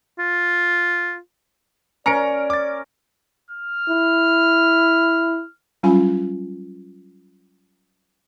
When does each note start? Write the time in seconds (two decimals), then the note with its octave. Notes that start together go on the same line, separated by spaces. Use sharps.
0.19 F4
2.06 C#4 A#4 D5 A#5 C#7 D7
2.50 D6 A6
3.51 F6
3.89 E4
5.83 F#3 G3 C#4 F4 G#5 B5